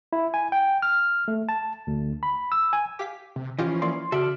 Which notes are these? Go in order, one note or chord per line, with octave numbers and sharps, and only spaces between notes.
E4
G#5
G5
F6
A3
A5
D2
B5
E6
G#5
G4 F5 B6
C3
E3 F3 C#4 F4 G4 D#5
A#3 E4 D5 C6
C#3 F#4 A4 D5 E5 F6